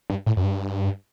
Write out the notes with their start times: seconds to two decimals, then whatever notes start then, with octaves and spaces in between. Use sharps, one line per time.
0.10 G2
0.26 A2
0.37 F#2
0.44 G2